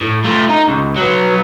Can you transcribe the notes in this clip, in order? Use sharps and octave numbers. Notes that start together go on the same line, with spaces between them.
A2
A3 F4
D#4
C#2
F#3 B3